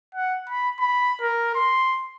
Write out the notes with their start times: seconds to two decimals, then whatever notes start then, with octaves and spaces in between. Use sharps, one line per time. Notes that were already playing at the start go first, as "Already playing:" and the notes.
0.15 F#5
0.49 B5
0.79 B5
1.21 A#4
1.55 C6